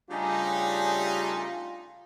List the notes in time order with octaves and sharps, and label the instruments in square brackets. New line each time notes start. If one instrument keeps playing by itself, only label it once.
[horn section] C#3 A3 D#4 [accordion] G3 D4 G4 [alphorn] F4 [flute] G#5